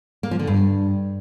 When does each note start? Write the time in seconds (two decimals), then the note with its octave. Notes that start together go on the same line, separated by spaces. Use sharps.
0.23 A#3
0.31 F3
0.39 D3
0.47 G2